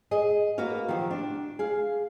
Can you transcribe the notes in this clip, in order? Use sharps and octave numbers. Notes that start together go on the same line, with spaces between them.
G#4 D#5
A#3 B3 F#4 F5
D#3 F3 F#3 G4
D4
G#4 F5